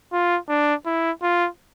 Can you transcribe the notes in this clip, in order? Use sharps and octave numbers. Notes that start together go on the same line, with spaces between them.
F4
D4
E4
F4